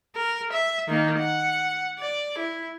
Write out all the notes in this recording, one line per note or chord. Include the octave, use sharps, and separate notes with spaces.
A#4
E5
D#3 A#3
F#5
D5
E4